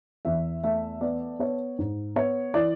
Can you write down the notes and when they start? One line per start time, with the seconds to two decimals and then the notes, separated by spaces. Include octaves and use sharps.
0.25 E2 E5
0.64 A3 E5
1.01 B3 D5
1.39 B3 C#5
1.79 G#2
2.16 B3 C#5
2.54 E3 D5